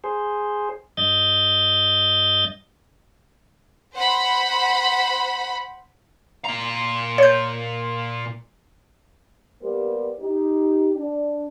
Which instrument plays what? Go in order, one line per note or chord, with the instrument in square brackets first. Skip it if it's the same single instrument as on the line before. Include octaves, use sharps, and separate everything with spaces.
[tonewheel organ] G#4 C5
G2 D#5 G6 A6
[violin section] C5 F#5 B5
[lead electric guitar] A#2 A#5
[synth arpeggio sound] C#5 G6
[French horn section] G3 A#3 B3 G4 A#4 C5
D#4 G4
D4